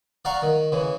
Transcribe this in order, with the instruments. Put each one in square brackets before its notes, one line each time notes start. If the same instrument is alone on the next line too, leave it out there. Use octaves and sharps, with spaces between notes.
[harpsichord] D5 F5 F#5 A#5 C#6
D#3
C#3 E3